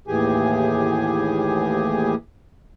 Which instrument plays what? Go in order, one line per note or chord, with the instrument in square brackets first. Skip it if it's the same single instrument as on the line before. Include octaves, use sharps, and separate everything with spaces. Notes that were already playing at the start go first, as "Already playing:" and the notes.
[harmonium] D#2 A2 E3 G4 G#4 G#5